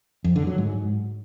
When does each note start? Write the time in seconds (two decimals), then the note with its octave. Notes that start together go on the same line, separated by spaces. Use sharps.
0.24 F2
0.36 D3
0.47 F#3
0.58 G#2